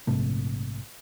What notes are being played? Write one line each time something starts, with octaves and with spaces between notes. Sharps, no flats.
A#1 G#2 C3 A3